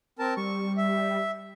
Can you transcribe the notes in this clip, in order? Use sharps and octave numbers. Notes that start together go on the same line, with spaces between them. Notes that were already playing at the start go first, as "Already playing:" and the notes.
C4 A#4 A5
G3 C#6
E5